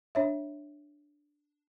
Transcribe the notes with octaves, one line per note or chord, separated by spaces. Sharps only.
D4 C#5 E5